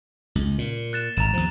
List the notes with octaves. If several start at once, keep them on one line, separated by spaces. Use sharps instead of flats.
C#2
A#2
F#6 A6 E7
G#1 A#5 A6 E7
D#2 F3